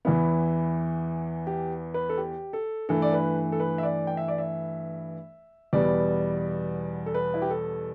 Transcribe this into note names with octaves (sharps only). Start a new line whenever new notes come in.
E2 E3 B3 E4
G4
B4
A4
G4
A4
G2 E3 A3 A4
D5
B4
A4
B4
E5
D5
G5
E5
D5
E5
E2 B2 G3 B3 D5
A4
B4
E4
G4
A4